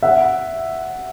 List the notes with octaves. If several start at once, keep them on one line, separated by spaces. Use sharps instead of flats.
E5 F#5